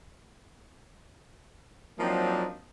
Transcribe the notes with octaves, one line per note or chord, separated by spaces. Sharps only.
F3 F#3 A#3 C4 D4 D#4